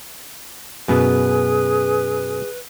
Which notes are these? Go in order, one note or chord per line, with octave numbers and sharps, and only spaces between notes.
F#2 B2 B3 G#4 B4